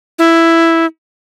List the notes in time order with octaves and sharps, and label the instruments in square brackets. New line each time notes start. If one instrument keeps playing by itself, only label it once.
[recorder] E4